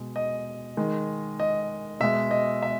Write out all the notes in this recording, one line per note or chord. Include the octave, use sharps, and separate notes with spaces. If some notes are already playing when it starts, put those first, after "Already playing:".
Already playing: B2 G#3
D#5
D#3 G#3
D#5
B2 G#3 E5
D#5
E5